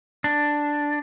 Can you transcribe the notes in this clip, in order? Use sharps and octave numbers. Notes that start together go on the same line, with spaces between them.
D4